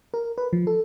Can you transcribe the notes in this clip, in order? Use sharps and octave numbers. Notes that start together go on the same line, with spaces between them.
A#4
B4
F3
A4